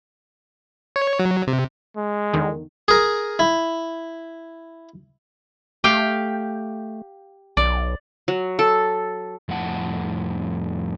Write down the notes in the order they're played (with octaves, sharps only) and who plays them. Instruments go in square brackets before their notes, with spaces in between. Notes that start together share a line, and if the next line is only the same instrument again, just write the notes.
[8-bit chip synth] C#5
F#3
C3
[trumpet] G#3
[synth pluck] E2 D3 D#3
[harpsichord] G#4 A#4
E4
[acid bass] A3 [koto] G4 F5 G5
[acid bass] B1 [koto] D5
[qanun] F#3
A4
[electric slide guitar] F2 A2 F#5 A5